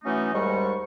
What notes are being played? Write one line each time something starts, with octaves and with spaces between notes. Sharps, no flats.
E3 F#3 A3 C#4 D#4
D#2 G#2 G3 G#3 C#6